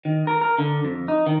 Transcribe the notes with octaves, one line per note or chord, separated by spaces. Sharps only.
D#3
A#4
A#4
D3
F2
D#4
D#3